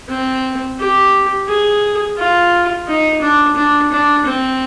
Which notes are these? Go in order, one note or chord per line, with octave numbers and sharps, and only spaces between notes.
C4
G4
G#4
F4
D#4
D4
D4
D4
C4